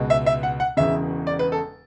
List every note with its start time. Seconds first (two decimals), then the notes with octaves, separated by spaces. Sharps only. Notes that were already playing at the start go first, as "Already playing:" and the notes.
Already playing: C#2 B2 G#3
0.10 E5
0.26 E5
0.43 F#5
0.60 F#5
0.77 E1 E2 C#3 E5
1.27 D5
1.39 B4
1.52 A4